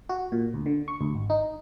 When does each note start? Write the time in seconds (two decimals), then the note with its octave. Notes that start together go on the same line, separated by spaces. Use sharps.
0.09 F#4
0.32 A#2
0.54 D2
0.66 D3
0.88 C#6
1.01 D2
1.15 G#1
1.30 D#4